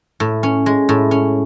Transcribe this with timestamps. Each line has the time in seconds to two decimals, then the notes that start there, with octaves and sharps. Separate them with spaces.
0.20 A2
0.43 C#4
0.66 G#3
0.89 A2
1.11 C#4